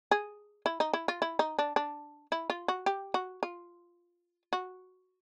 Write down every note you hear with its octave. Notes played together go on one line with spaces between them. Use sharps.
G#4
E4
D#4
E4
F4
E4
D#4
D4
D4
E4
F4
F#4
G4
F#4
F4
F#4